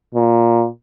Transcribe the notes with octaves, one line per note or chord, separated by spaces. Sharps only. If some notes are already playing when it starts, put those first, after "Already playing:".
A#2